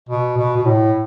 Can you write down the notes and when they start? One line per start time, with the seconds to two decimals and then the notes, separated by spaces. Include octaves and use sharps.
0.09 B2
0.37 B2
0.57 B2
0.66 A2